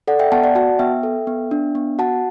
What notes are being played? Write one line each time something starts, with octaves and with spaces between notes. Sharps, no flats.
A4 D5 F#5
E5 G5
B3 F#5 A5
D5 F#5
F#4 F#5 A5
B3 E5 G5
A4
B3
D4
B3
F#4 F#5 A5